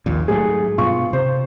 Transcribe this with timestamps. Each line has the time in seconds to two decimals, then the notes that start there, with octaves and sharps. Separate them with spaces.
0.06 A#1 D#2 A#2
0.28 G#2 F#3 A3 G#4
0.78 G2 B2 F4 C#6
1.13 C3 C5